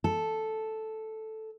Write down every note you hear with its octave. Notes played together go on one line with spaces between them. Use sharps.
A4